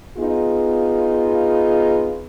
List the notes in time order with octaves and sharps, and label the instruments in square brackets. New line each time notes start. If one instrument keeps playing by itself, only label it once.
[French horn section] B3 D#4 F4 G#4